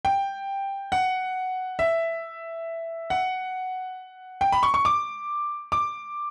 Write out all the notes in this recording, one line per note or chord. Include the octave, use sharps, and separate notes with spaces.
G5
F#5
E5
F#5
G5
B5
C#6
C#6
D6
D6